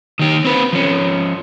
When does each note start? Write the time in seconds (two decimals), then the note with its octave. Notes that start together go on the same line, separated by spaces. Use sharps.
0.19 D#3 G4
0.45 C4 B4
0.73 F3 C#4